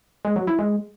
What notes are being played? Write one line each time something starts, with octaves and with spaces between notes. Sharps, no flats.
G#3
F#3
E4
G#3